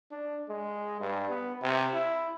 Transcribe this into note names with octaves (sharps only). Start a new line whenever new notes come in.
D4
G#3
G2
B3
C3
E4